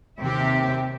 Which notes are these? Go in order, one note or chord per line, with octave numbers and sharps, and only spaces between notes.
D#2 C3 G4 E5